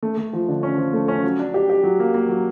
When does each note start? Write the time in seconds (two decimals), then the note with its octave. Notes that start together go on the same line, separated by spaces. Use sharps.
0.03 A3
0.17 A3
0.33 F3
0.48 D3
0.63 C#4
0.78 F3
0.93 A3
1.08 C#4
1.23 F#3
1.39 D4
1.54 G4
1.70 G4
1.84 F#3
2.00 A#3
2.14 A#3
2.29 F#3